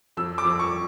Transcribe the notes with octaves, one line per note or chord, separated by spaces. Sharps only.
F2 E6
D6
F2
C#6